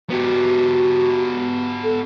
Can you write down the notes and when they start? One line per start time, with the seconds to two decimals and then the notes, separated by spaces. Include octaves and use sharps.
0.10 B3 F#4 G4
1.84 A4